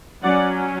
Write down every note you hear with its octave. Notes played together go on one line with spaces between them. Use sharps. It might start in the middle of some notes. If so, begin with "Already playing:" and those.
F#3 C#4 D5 F#5